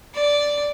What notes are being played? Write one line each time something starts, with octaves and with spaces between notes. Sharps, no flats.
D5